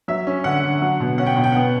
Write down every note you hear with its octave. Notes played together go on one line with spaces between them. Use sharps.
F#3 E5
C#4
D3 F#5
D3
F#3
B2
C#4 F#5
G5
B2 F#5
G5
B3 F#5